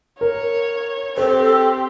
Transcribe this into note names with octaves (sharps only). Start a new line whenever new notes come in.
A#4 C#5
C4 G4 A4 C5